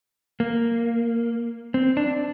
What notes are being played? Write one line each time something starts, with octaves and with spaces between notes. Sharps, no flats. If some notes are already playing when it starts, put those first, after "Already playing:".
A#3
C4
D4